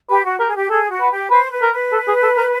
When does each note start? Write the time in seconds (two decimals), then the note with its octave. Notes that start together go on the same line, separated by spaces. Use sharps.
0.09 G4 B4
0.24 F#4
0.40 G4 A#4
0.48 G#4
0.55 G4
0.70 G#4 A4
0.90 F#4
1.01 B4
1.11 G4
1.31 B4 C5
1.51 B4
1.62 A#4
1.72 B4
1.92 A4
2.08 G#4
2.23 A4
2.37 A#4